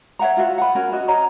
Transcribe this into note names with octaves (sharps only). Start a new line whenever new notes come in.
C#5 E5 F#5 A#5
F4 F#4 E5
F#5 B5
C#4 F#4 A#4
F#4 D#5
C#4 D#5 A#5